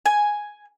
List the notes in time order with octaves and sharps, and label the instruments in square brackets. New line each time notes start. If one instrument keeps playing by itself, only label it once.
[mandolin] G#5